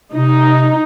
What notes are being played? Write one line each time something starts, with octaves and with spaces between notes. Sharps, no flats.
C3 D#4